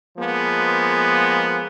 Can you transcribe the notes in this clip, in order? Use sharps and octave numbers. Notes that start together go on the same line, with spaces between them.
F3 G#3 A#3 B3